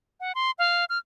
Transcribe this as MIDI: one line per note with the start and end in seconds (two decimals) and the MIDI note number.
0.20 0.32 78
0.35 0.51 84
0.59 0.85 77
0.90 0.98 89